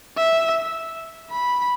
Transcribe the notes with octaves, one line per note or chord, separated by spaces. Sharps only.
E5
B5